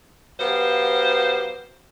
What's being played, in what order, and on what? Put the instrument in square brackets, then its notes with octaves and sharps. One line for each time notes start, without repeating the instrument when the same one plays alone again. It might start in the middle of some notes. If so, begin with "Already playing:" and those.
[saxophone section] F#3 B3 G4 C5 F5